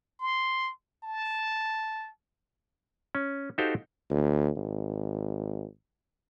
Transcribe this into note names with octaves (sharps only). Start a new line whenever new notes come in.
C6
A5
C#4
D#4 F#4 G4 A4 C5 F5
D2
G#1